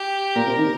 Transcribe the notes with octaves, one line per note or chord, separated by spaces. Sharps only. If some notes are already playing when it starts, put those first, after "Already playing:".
Already playing: G4
A#2 A#4
C3
D#3